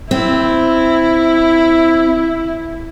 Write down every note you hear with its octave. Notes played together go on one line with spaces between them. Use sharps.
C4 E4